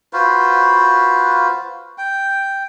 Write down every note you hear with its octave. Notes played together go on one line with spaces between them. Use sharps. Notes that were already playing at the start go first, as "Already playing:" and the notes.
F4 F#4 B4 C5
G5